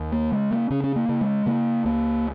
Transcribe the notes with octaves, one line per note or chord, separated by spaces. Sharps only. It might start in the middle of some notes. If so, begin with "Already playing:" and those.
Already playing: D#2
A#3
C#3 G#3
A#3
C#3 C#4
C#4
A#3
C#3
G#3
C#3 A#3
C#2 A#3